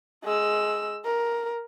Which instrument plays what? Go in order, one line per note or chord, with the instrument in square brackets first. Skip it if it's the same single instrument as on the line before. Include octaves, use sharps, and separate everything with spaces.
[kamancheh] G#3 E6
A#4